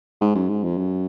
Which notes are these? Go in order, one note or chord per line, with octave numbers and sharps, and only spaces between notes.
G#2
F#2
G#2
F2
F#2